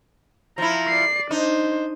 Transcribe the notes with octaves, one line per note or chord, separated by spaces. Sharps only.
F3 E4 A#5
D5 C7
D4 D#4 C5